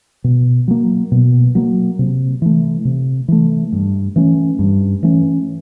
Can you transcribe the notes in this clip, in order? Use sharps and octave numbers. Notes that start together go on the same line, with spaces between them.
B2
F#3 A#3
B2
F#3 A#3
C3
E3 A3
C3
E3 A3
G2
E3 A3 C#4
G2
E3 A3 C#4